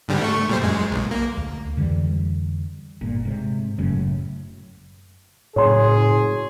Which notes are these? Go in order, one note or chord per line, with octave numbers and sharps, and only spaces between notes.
G#2 D3 G3
A3 C#6
A#2 G3 C5
F#2 G#3
B1
A#3
D2
F2 D3 E3 G3
G1 A#2
G#2 C3
F#1 F#2 A2 C#3
F#1 A2 G#4 C#5 C6